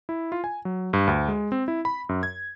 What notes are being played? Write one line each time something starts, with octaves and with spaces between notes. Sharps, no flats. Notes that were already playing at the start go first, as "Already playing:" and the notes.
E4
F4
G#5
F#3
G2
D2
G#3
C4
E4
B5
F#2
G#6